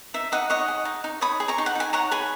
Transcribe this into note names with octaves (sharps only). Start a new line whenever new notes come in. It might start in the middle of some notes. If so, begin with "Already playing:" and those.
D#4 E5
D#4 D#5 F#5
C#5 D#5 F#5
G#4
D#4
D#4
C#5 B5 D#6
G#4
A#5 C#6
D#4
F#5
D#4 G#5
C#5 F#5 A#5
G#4 G#5 B5